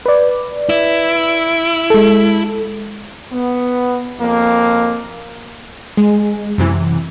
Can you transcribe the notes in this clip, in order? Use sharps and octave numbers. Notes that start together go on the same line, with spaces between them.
B4 D5
E4
G#3 A4
B3
F2 A#3
G#3
F#2 C3 E3